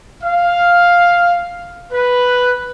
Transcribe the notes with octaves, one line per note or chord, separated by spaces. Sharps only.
F5
B4